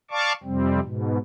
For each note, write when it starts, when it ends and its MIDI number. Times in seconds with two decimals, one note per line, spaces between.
0.11 0.33 74
0.11 0.33 77
0.11 0.33 81
0.11 0.33 85
0.11 0.33 86
0.43 0.80 41
0.43 0.80 48
0.43 0.80 55
0.43 0.80 60
0.83 1.18 44
0.83 1.18 47